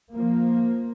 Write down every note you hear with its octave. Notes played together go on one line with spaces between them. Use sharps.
F3 A#3